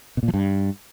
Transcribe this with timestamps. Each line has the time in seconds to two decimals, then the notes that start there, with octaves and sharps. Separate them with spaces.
0.17 B2
0.23 A#2
0.28 F3
0.34 G2